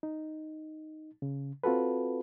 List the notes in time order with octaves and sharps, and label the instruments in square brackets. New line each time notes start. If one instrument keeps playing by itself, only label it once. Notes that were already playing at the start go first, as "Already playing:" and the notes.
[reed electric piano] D#4
C#3
C4 F4 F#4 A4 B4